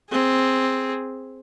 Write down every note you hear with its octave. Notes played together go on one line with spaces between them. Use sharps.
C4 G#4